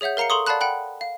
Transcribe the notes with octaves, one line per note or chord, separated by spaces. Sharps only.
G#4 C#5 E5 F#5 G6
A#4 F5 A#5 C7 C#7
A4 A#5 C6 C#6 D#6
D5 F5 F#5 A5 B5 F#6
F#5 G5 B5 F#6
F5